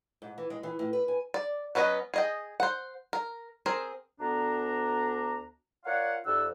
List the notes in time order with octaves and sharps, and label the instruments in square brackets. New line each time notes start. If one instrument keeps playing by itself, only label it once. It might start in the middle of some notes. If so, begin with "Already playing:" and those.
[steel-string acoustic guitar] G#2
E3
G#3
E3
A2
B4
G#5
[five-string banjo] D5
F#3 B3 C#4 B4 D#5
G#4 D#5 G5
C5 F#5
A#4
C4 G#4 A#4
[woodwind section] D2 B3 D4 A#5
F4 A#4 C#5 D5 F5 F#5
F2 C3 D#4 D5 F#5 E6